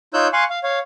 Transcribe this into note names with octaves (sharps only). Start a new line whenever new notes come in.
D#4 F4 C#5 E6 F#6 G6
F5 G#5 C6 C#6 F#6
F5
C#5 F5